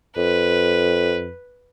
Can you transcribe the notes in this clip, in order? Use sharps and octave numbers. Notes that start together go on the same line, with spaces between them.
F2 B4